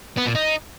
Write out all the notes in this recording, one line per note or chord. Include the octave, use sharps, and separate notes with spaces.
B3
A#2
D#4